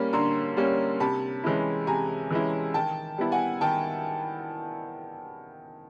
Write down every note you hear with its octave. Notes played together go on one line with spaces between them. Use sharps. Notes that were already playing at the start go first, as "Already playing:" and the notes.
Already playing: G3 A#3 C#4 B5
D3 A#5 C6
G3 A#3 C#4
C3 A5 B5
E3 G#3 C#4 E4
C3 G#5 A#5
E3 G#3 C#4 E4
D#3 G5 A5
G3 B3 E4
F#5 G#5
D#3 G5 A5